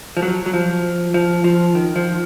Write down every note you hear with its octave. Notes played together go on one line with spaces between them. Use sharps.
F3
F#3
F#3
F3
F3
F3
D#3
F3